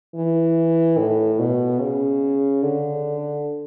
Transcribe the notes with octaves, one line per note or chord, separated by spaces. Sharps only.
E3
A2
B2
C#3
D3